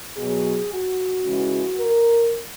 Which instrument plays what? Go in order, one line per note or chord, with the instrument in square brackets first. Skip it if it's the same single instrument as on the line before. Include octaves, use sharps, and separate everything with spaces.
[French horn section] B2 F#3 G#4
F#4
C#3 E3 G#3
A#4